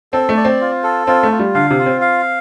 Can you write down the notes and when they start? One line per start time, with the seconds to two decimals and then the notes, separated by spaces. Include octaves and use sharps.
0.13 C4 A4
0.29 A3
0.37 D5
0.45 C4
0.61 F4
0.83 A4
1.07 C4 F4
1.23 A3
1.32 F4
1.39 G3
1.55 D3 F5
1.71 C3
1.79 F4
1.86 C4
2.01 F5